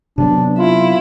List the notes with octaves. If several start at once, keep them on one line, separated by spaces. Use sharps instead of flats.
C3 F#3 B3 D4
E4 F4